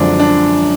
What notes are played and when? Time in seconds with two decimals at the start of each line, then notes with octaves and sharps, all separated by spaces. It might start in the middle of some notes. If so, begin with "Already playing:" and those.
Already playing: F#2 D3 F3 G#3 C4 D4
0.19 D4